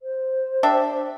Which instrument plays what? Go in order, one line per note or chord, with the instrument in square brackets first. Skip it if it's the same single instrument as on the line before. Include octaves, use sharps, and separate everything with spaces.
[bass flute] C5
[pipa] D4 G4 E5